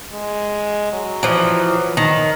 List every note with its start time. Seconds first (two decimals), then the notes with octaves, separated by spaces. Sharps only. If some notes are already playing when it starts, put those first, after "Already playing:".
0.12 G#3
0.93 F#3
1.23 E3 F3
1.97 D#3